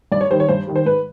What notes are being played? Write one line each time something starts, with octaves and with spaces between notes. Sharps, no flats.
G2 D5
C#5
D#3 G3 C5
C#5
G2 C5
D#3 G3
C5
G#2 B4